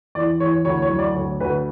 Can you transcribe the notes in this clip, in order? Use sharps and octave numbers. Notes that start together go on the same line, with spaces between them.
E2 D5
E2 C#5
D2 C#5
C#5
F#3
D5
D2 C#5
D2 B4